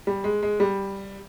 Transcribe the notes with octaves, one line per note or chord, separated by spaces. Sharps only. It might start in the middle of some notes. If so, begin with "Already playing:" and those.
G3
G#3
G#3
G3